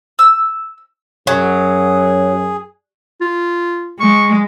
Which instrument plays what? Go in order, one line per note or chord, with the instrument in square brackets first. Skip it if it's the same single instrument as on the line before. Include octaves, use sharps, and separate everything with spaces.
[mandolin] E6
[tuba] F#2 [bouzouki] F#3 [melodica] G#4
[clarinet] F4
[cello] G#3 [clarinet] C#6